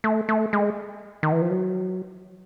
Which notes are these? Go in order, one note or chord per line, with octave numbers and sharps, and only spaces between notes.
A3
A3
G#3
D#3
E3
F3
F#3